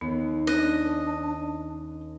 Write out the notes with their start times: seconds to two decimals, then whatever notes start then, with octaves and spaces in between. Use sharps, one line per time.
0.01 D#2 B3
0.47 C#4 D4 D#5 F#6